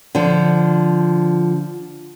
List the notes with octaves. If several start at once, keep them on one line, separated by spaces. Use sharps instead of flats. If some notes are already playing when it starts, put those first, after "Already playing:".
D3 F3